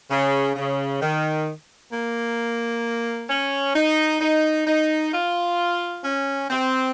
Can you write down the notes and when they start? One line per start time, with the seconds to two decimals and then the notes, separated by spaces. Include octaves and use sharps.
0.10 C#3
0.56 C#3
1.01 D#3
1.93 A#3
3.30 C#4
3.75 D#4
4.21 D#4
4.67 D#4
5.13 F4
6.04 C#4
6.50 C4